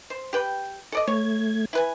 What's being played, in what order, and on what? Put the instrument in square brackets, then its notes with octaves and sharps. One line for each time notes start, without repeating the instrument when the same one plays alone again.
[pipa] C5
G4 B4 G5
A4 D5 D#5
[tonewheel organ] A3 G#6 [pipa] C#5
[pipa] E4 B4 G#5